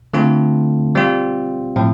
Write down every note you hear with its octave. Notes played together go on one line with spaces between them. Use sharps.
D3 A3 C4 F4 A4
G3 C4 F4
A2 F3 C4